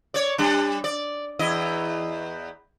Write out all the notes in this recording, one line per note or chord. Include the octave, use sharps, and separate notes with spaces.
C#5 D5
G3 D4
D5
E2 E4 D#5